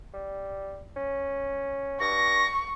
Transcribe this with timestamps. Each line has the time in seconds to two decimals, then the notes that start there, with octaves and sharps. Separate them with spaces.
0.14 G3
0.96 C#4
2.00 G2 C#6 A#6